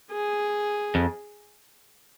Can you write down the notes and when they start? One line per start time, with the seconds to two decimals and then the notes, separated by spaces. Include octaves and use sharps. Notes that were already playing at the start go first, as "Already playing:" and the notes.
0.11 G#4
0.95 F2